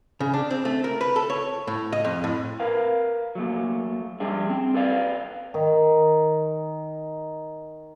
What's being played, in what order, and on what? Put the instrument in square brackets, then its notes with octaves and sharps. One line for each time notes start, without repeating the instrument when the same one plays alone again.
[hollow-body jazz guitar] C#3
D4
C4
A3
A#4
B4
A4
C#5
A2
D#5
F2
A2
[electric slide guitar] A#4 B4 F5
F#3 A3 A#3
G3 D4 G#4 E5
C4
A4 B4 D5 F5
[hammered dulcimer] D#3 D#4